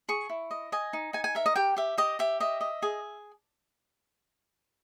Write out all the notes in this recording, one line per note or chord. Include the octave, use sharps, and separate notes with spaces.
G#4 C#6
E4
D#5
D#5 G#5
D#4
D#4 G#5
G#5
A#4 E5
D#5
G4 G5
G4 E5
G4 D#5
G4 E5
D#5 E5
D#5
G#4